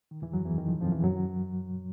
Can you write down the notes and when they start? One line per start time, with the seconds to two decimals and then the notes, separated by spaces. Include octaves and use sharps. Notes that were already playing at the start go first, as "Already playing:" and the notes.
0.11 D#3
0.22 E2 E3
0.33 F#2 F#3
0.45 E2 E3
0.58 D#3
0.69 F2 F3
0.81 F2 F3
0.92 E2 E3
1.04 F#2 F#3